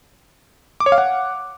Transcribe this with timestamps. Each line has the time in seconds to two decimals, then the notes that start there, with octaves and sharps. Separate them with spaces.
0.80 D6
0.86 C#5
0.92 F5
0.98 F#5